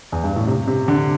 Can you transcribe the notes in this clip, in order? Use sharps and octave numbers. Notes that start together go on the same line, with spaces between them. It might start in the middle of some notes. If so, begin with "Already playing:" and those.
E2
G2
A2
C3
C3
D3